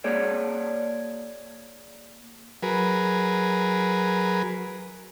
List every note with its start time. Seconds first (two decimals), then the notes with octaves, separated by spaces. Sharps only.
0.04 A#3 G#4 C#5 D5
2.63 F#3 G#4 A#4 B4